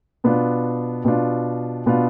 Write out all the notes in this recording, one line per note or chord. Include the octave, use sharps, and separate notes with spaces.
B2 B3 D4 F4
B2 B3 D4 F4
B2 B3 D4 F4